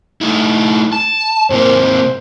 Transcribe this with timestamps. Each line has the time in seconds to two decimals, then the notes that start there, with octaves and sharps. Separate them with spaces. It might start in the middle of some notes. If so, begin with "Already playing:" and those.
0.21 A3 D#4 E4
0.93 A5
1.50 G#2 C3 A#3 C5